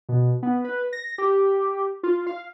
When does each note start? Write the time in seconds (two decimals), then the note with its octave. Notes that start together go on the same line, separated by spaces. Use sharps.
0.09 B2
0.43 B3
0.65 B4
0.93 A#6
1.18 G4
2.03 F4
2.27 F5